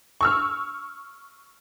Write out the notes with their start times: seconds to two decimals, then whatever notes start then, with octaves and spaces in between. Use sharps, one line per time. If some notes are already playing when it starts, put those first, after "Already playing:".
0.21 C#6 E6 F6